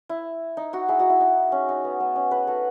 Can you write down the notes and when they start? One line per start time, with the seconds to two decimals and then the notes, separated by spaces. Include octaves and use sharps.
0.09 E4
0.57 D#4
0.73 D#4 F#4
0.89 E4 G#4
0.99 D#4 F#4
1.10 E4
1.20 D#4
1.52 C#4
1.69 D#4
1.85 B3
2.00 B3
2.16 C#4
2.31 G#4 B4
2.47 F#4 A4